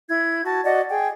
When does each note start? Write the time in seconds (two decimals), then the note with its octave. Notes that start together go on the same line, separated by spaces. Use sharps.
0.09 E4 G#6
0.45 F#4 A5
0.64 F#4 D5 D#5 F#5
0.89 G#4 G5